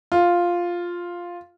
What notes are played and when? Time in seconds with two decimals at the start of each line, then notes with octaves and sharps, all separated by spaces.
0.12 F4